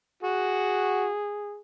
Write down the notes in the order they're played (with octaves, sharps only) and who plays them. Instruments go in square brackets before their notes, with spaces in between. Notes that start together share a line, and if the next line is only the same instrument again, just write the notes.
[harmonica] F#4 [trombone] G#4